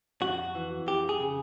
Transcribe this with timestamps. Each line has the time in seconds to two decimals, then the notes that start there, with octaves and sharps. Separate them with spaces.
0.22 F2 F#4
0.55 E3
0.87 F2 G4
1.09 G#4
1.20 C#3